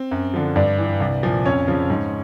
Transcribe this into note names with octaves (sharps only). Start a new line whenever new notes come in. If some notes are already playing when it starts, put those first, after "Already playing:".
Already playing: C4
F#2
D3 F3
G2 D4 D5
E3
C2
A#2 F3
F2 C#4 C#5
C#3 F3
G#2